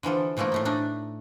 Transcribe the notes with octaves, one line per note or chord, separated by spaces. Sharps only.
D3 E3 F3 A4
B2 E3 F3 A3 A#3
A2 A3 A#3
A3 D4 D#4